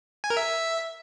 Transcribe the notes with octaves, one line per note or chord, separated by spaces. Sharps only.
G#5
A#4
E5